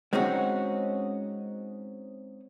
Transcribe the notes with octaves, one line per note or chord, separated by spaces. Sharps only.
G#3 C4 C#4 D#4 F#4